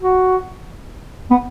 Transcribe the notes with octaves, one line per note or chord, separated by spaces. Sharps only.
F#4
B3